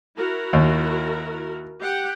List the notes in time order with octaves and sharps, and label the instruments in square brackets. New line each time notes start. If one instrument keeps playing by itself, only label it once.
[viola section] E4 F#4 A#4
[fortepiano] D#2
[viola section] G4 F#5 G5